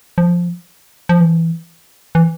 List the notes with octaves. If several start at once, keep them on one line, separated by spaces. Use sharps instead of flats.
F3
F3
E3
E3